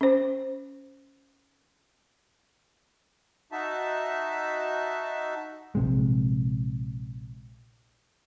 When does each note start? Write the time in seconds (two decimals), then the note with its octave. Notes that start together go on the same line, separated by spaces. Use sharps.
0.01 C#4 C5
3.52 D#4 F#4 E5 A5
5.75 A#1 C3 G#3